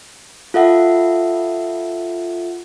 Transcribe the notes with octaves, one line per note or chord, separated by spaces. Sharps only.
F4 A4 E5 F#5